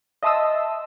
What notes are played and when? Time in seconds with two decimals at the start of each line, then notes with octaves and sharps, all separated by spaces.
0.23 D#5 E5 A5 C6 D#6 E6